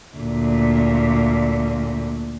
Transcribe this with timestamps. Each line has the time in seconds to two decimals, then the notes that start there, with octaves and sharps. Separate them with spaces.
0.17 D2 A#2